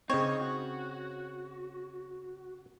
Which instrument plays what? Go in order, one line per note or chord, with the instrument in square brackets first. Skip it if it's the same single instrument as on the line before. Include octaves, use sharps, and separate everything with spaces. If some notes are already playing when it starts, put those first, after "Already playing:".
[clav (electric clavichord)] C#3 C4 [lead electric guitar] D#4 [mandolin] C#5
[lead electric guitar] F#4